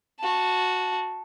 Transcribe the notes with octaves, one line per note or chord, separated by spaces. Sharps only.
F#4 A5